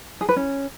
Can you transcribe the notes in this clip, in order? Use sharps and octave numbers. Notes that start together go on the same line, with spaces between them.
G#4
B4
C#4